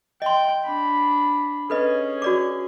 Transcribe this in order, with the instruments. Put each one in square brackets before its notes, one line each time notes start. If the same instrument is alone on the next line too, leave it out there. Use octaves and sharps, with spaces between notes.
[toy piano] D#5 C6 [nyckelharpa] G5
[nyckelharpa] D4 B5
[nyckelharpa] C#4 G#4 [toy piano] A4 B4 D#5
[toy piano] F#4 D5 D6